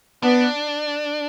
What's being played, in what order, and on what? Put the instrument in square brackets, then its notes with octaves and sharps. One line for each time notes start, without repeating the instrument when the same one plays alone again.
[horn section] B3 [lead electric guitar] D4